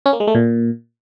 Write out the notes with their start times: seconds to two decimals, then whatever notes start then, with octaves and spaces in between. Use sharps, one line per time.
0.06 C#4
0.13 A#3
0.20 G#3
0.27 A3
0.35 A#2